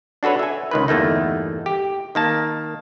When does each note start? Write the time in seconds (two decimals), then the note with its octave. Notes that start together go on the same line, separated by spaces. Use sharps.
0.23 D4 F#4 A4 B4 C#5
0.39 E5 G#5
0.71 C#2 D#3 B4
0.88 G1 E2 A3 A#3 D#4
1.66 G4
2.15 D#3 A#3 A5